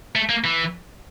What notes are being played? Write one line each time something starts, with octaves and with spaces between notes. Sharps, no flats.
A3
A#3
E3